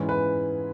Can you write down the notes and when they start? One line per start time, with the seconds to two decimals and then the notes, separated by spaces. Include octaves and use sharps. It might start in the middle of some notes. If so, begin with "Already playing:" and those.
Already playing: G#2 E3 G#3 C#4
0.09 B4